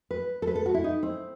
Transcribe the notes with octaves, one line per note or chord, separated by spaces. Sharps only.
B4
A4
B4
A4
F#4
E4
D#4
C4